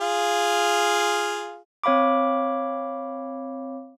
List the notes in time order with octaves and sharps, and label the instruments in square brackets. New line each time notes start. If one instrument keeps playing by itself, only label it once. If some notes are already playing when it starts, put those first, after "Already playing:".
[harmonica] F4 G#4 F5
[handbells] C4 C#5 F5 B5 D6